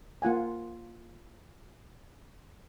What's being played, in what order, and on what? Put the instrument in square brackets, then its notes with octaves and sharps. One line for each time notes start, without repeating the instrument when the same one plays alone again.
[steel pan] A#3 F4 F#5 G#5